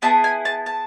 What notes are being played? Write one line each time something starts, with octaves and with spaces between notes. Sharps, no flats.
B3 E4 G#4 A5
G#5
A5
A5